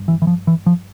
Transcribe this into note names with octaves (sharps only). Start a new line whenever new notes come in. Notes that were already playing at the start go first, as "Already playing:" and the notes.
Already playing: G1 G2
E3
E3
F3
E3
F3